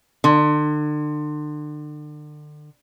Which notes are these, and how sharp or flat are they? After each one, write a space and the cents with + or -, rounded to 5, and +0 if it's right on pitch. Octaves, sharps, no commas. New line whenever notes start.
D3 +35